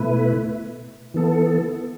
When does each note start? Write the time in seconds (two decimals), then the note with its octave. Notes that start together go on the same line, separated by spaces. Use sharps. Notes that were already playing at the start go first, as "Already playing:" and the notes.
Already playing: B2 A3 E4 B4
1.14 E3 B3 A4